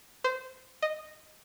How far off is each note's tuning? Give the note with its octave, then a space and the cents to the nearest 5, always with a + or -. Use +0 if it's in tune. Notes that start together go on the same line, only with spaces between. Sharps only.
C5 -20
D#5 -10